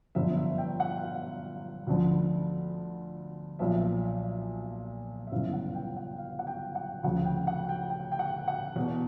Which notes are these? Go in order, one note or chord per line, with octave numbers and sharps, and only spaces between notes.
G1 F#2 D3 F3 E5
E5
G5
F#5
F5
D2 D3 F3
B1 A#2 F3 E5
E5
G1 F#2 C#3 E3 F5
F#5
G5
F#5
F5
F#5
G5
F#5
D2 C#3 F3 F#5
G5
F#5
G5
G5
G5
F#5
F#5
E2 B2